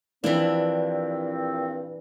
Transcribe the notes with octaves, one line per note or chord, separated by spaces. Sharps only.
G2 A#2 E3 F3 C4 D4 E4 F4